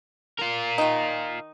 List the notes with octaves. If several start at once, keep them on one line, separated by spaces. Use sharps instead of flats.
F4 A#4
D#3 D#4